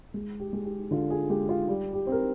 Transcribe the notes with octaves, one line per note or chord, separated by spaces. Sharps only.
G#3
G4
G#3
G4
D3 F4
F4 G#4
G#3 G4
F4
G3
G4
C4
A#4